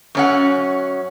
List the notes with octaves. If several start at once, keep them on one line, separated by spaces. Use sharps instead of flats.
F#2 C#4 F#5